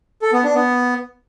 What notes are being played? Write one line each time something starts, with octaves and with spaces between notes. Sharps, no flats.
A4
B3
D4
B3